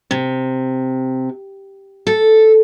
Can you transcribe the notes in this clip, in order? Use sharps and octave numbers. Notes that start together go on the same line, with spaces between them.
C3
A4